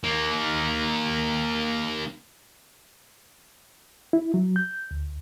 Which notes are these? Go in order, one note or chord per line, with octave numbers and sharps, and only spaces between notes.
A#3 D#4
E4
F#3
G6
D2